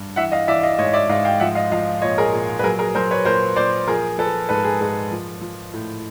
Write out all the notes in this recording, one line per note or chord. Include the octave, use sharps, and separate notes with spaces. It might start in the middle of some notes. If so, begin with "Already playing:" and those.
Already playing: G2
E3 E5 F#5
D#5 F5
E3 D5 E5
D#5 F5
G#2 C#5 D#5
D5 E5
G#2 D#5 F5
F5 G5
F3 E5 F#5
D#5 F5
F3 D#5 F5
A#2 C#5 D#5
G#4 A#4
A#2 G#4
B4
F#3 G#4 A#4
G#4 A#4
F#3 A#4 C5
B4 C#5
A#2 A#4 C5
A#2 C5 D5
F3 G#4 A#4
F3 A4 B4
G#2 A4 B4
G#4
G#2 G#4
F3
F3
A2